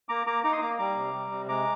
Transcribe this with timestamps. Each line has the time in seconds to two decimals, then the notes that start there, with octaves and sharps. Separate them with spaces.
0.09 A#3 A#5 D6
0.26 A#3 A#5 D6
0.44 D#4 A#5 D6
0.52 C6 D#6
0.61 A#3 A#5 D6
0.79 G3 A#5 D6
0.96 C3
1.14 G3
1.31 C3
1.48 G#3 A#5 D6